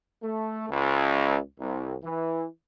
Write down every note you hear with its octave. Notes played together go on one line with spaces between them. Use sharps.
A3
C#2
C2
E3